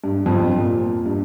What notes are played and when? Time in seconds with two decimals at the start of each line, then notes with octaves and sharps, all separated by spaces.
0.04 G2
0.26 F2
0.57 A#2
1.06 G2